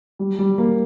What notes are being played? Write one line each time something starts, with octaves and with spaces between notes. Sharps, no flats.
G3
G3
A#3